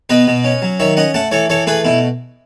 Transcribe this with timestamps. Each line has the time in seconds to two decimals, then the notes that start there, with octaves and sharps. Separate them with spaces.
0.09 B2 B4 D#5
0.27 B2
0.44 C#4
0.62 F#3
0.80 D#3 C#5 E5
0.97 C#4 D#5 F#5
1.14 A3 F#5 A5
1.31 E3 A4 C#5
1.50 E3 A4 C#5
1.67 A3 G#4 B4
1.85 B2 E4